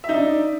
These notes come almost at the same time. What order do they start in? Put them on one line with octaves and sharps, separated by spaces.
E5 D#4 D4